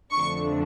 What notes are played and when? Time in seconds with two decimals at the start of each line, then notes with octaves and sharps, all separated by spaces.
0.11 F2 D3 F3 A3 D4 C#6